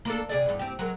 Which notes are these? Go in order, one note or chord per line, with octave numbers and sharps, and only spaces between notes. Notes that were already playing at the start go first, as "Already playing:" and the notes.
A#3 D4 A4
C3 G#4 D5
E2 G2
C4 G4
F#3 G#3 A#4